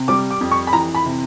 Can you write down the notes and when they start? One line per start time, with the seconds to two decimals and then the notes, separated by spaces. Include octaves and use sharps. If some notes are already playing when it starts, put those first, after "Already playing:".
Already playing: C3
0.08 G3 D6
0.30 D6
0.41 F2
0.51 C#6
0.67 B5
0.73 E3 A#5
0.95 B5
1.05 C3